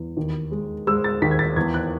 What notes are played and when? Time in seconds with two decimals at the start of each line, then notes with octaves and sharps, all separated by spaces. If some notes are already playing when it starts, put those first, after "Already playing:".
Already playing: E2
0.17 D#2
0.52 G#3
0.87 G#3 E6
1.04 A6
1.22 D#2 B6
1.31 G#6
1.39 A6
1.56 E2 G#6
1.74 F#6